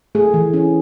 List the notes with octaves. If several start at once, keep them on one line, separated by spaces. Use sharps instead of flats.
A3 G#4
E3
C#4